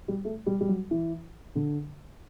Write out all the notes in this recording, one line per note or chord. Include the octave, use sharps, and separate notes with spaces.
G3
A3
G3
G3
F#3
E3
D3